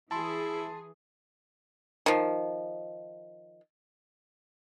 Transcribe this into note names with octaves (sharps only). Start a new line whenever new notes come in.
E3 E4 G#4 A5 C6
D#3 F3